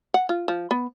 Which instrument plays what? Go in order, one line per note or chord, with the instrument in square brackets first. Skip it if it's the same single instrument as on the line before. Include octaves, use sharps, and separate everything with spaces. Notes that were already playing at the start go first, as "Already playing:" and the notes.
[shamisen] F#5
F4
F3
B3